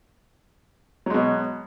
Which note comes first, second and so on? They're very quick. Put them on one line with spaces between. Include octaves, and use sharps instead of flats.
F#3 G#3 B2